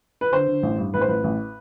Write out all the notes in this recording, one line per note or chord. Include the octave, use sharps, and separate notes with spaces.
B4
D3 C5
D3
A1
G2
A1 B4
C5
A1 B4
A1